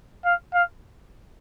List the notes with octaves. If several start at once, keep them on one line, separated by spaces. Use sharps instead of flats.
F5
F5